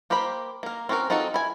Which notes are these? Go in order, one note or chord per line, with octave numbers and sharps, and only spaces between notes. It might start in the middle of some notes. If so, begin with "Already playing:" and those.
A#3 G4 A#4 C5 B5
A#3 A#4
C4 C#4 F#4 G#4 A#4
C4 D#4 F4 F#4 A4
E4 G#5